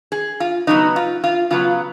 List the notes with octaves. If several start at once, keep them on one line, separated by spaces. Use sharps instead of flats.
G#4
F4
C#3 F#3 B3 D#4
F4
F4
C#3 F#3 B3 F4